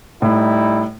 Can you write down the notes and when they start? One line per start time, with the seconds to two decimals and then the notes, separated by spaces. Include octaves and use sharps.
0.22 A2 G3 D#4 E4